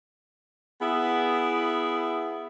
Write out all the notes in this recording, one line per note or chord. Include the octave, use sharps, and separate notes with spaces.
B3 E4 G#4